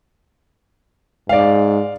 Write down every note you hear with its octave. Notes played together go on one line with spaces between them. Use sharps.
G#2 D5 F5